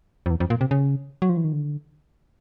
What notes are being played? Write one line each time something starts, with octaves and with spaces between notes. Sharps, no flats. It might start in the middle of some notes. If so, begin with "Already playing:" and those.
F2
E2
F2
A#2
C3
C#3
F#3
F3
E3
D#3
D3